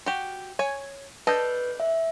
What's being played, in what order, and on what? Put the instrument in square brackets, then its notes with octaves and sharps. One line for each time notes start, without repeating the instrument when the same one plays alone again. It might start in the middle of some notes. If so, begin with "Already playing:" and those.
[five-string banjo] F#4 G4
C#5 G#5
[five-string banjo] D4 A4 D#5 [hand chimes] B4 G6
[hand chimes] E5